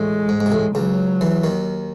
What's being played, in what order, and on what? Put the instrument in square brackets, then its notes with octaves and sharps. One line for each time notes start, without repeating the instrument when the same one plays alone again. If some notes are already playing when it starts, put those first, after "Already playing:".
Already playing: [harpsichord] A1 A2 [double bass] G#3
[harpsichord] G#2
G#2
C3
A1 A2
[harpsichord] C#2 C#3 [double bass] F#3
[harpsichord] E2 E3
D#2 D#3